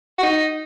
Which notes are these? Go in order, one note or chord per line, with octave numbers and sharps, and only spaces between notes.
F#4
D#4